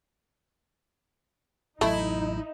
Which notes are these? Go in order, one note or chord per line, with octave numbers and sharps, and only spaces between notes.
A1 F#3 A3 D#4 E4